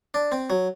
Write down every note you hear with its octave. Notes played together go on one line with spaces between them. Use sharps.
D4
C4
F#3